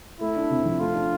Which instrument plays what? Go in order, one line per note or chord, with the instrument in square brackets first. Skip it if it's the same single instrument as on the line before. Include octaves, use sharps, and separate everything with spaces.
[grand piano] A3 [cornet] E4
[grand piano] D4
C3
F3
[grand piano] A3 [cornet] F4
[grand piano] D4